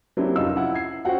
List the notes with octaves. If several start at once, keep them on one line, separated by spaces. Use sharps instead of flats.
F#3 A#3 C4 D4 E4 G4
F1 C#4 D#4 F4 E6
E4 F#5
G#6 C7
C#4 F4 F#4 C5 F#5 G5